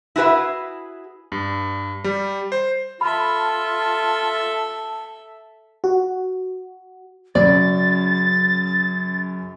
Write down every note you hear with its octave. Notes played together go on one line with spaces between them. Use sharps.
E4 F#4 G#4 B4 E5
G2
G3
C5
F4 A4 E5 A5 B5
F#4
F#2 C#3 D5 A6